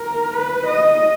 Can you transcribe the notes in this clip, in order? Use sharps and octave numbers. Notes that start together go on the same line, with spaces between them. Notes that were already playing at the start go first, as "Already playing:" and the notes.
Already playing: A#4
B4
D#5